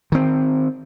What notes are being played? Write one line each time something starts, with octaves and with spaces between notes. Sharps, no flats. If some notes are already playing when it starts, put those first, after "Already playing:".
D#3 C4